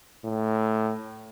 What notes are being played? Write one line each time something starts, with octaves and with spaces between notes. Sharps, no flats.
A2